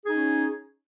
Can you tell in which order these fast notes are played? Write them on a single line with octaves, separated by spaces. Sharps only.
G#4 D#4 C#4